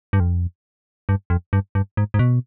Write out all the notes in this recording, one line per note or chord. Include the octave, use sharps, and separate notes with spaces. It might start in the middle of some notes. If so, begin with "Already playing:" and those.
G2
F2
G2
F2
G2
G2
G#2
G#2
B2